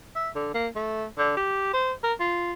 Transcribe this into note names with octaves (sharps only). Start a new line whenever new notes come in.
E5
D3
A#3
A3
D3
G4
C5
A#4
F4